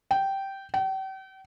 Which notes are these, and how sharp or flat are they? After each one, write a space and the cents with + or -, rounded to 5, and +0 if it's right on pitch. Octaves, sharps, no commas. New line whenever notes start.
G5 -10
G5 -40